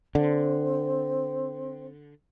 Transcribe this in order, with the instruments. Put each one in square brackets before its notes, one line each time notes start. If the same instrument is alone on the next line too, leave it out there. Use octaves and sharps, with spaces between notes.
[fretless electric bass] D3 [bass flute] C4